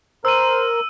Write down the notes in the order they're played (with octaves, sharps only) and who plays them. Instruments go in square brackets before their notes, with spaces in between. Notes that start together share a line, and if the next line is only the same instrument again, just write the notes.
[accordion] A#4 [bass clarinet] C5 [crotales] E6 D#7